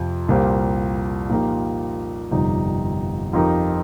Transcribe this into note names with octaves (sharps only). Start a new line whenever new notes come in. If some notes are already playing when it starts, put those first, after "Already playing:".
Already playing: F2 C3 F3
C2 A#2 A#3 G4 C5
A#2 F3 D#4 G4 A#4
G1 F2 C3 G3 D#4
F2 F3 D#4 G4 A#4